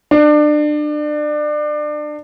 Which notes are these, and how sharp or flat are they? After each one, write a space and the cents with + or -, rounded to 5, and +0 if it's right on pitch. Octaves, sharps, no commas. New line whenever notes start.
D4 +30